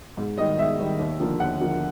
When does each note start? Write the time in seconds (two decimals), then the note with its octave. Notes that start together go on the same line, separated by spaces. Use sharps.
0.17 G#2
0.38 D#3 G3 D#5
0.58 G#2 E5
0.79 D#3 G3
0.99 D#2
1.19 D3 F3 A#3
1.40 D#2 F#5
1.60 D3 F3 A#3